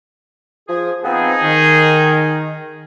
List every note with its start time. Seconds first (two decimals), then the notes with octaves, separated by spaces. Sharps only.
0.68 F3 G#4
1.04 F3 B3 C4 D#4 G#4
1.42 D#3